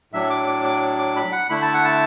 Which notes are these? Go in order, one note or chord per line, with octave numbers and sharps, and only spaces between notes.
A2 F#3 D4 E5
D6
D6
D6
D6
B5
F#5
D3 A3 E4 B5
A5
F#5
A5